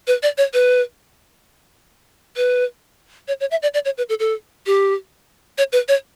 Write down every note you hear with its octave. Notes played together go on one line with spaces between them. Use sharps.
B4
D5
C#5
B4
B4
C#5
C#5
E5
D5
D5
C#5
B4
A4
A4
G4
C#5
B4
C#5